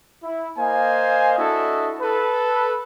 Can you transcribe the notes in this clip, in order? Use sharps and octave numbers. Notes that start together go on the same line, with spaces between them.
E4
A#3 C5 D#5 F5 G#5
D4 E4 F#4 A4 D#5
A4 B4